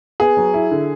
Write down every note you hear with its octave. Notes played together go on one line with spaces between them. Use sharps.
B3 G#4
F#3
E4
D3